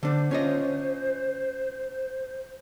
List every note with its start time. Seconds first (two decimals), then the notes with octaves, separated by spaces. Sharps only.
0.03 D3 D4 C5
0.31 C#4 F4 D#5